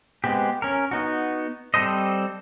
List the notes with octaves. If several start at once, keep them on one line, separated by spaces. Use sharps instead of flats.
G#3 B3 C4 G4
C#4 A#4
B3 D#4 F#4
G3 C4 A4 C5 D#5